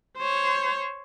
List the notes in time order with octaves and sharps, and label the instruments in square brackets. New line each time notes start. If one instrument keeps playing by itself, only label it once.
[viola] C5 C#5